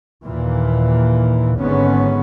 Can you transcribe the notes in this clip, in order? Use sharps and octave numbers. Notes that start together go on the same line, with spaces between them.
D#2 A#2 E3
G#1 G#2 D3 B3 C#4